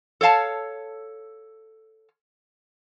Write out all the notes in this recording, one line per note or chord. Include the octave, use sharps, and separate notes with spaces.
A4 C#5 F5 A5